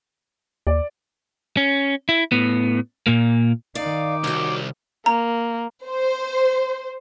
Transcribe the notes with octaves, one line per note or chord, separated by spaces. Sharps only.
D#2 D5
C#4
E4
A2 B3
A#2 A#3
D#3 D#4 D5 F5 D6
C2 F#4 C#5
A#3 A#5
C5